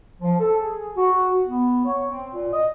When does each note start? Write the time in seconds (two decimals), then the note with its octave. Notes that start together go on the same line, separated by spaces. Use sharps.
0.21 F3
0.40 A4
0.62 G#4
0.95 F#4
1.45 B3
1.85 C#5
2.10 C4
2.31 A#2
2.51 D#5